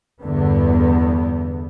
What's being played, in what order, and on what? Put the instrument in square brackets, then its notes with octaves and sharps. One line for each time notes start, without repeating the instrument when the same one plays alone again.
[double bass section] E2 G2 D3 B3